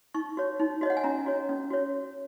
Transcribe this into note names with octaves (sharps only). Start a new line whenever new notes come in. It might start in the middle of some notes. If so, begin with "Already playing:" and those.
D#4 C#6
F#4 C#5
D#4
F#4 C#5 D#5 F#5
G#5
C#4 A#5
F#4 C#5
C#4
F#4 C#5